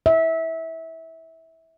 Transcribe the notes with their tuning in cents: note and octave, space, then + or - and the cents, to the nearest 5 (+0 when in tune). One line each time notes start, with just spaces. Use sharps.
E5 -20